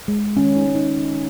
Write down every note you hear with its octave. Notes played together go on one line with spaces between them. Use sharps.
G#3
D#3 C#4
D#4
G#3
D#4